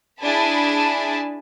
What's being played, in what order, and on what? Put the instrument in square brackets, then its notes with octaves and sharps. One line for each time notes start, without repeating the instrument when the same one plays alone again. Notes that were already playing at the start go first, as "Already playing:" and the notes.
[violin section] D4 E4 G#4 G#5 A5 B5